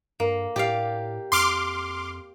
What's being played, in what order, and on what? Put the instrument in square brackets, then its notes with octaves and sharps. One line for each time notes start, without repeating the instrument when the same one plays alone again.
[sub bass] G2 [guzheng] A#3
[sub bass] A2 [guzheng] G4 D5 F5
[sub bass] F2 [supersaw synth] C6 D6 F6